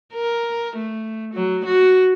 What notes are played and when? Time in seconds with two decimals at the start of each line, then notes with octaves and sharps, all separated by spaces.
0.14 A#4
0.77 A3
1.34 F#3
1.66 F#4